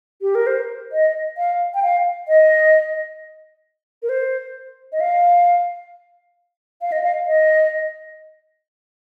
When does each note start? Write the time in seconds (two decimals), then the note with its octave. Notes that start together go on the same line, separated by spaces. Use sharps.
0.21 G4
0.35 A#4
0.47 C5
0.92 D#5
1.37 F5
1.74 G5
1.83 F5
2.28 D#5
4.03 A#4
4.09 C5
4.92 D#5
5.00 F5
6.81 F5
6.92 D#5
7.04 F5
7.26 D#5